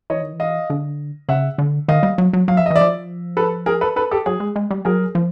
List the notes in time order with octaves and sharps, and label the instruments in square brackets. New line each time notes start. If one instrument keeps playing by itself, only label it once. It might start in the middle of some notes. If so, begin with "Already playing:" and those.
[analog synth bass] E3 [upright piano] C#5 D#5
[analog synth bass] D#3
E3
[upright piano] D#5 F5
[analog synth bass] D3
[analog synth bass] C#3 [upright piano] E5 F#5
[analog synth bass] D3
[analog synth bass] D#3 [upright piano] D#5 F5
[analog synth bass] G3
F#3
F#3
[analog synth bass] F#3 [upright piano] F5
[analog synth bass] F3 [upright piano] E5
[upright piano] D#5
[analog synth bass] E3
[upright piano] D5 E5
[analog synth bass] F3
[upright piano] A4 B4
G#4 A#4
A4 B4
A4 B4
G4 A4
[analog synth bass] F#3 [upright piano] G#4
[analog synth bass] G#3
G#3
G3
[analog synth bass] F#3 [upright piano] G#4 A#4
[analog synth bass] F3